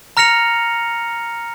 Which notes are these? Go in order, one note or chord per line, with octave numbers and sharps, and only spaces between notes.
A#5 F6 A#6 C#7 F7